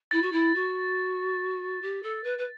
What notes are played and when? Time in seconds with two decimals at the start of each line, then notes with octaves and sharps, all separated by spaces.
0.11 E4 A6
0.22 F#4
0.32 E4
0.55 F#4
1.82 G4
2.03 A4
2.24 B4
2.38 B4